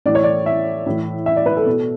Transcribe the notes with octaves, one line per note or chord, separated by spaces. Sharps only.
A2 E3 D5
C#5
D5
E5
A2 E3
E5
D5
B4
A4
B2